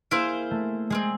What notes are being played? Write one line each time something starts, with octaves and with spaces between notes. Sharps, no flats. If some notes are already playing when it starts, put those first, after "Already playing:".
A#3 E4 G#4 C5 F5
A3
G#3 C4 F4 G#4